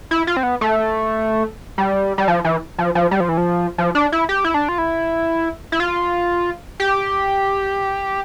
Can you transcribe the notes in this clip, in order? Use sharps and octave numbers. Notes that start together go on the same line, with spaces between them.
E4
F4
C4
B3
A3
G3
G3
F3
E3
F3
F3
G3
F3
E3
F3
F3
D4
E4
G4
E4
D4
F4
E4
E4
F4
G4